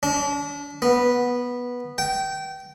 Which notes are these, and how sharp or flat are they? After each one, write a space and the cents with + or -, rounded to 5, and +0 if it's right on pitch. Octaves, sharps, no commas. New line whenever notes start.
D4 -40
B3 -10
G5 -25